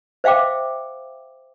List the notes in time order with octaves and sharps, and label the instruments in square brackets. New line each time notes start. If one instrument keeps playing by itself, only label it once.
[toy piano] C5 E5 F5 G5 D6